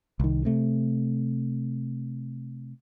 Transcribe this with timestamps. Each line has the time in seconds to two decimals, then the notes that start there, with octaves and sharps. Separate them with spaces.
0.20 C2 D#3
0.45 C3 A3